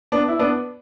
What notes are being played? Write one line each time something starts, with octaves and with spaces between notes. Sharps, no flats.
B3 D4
E4
B3 D4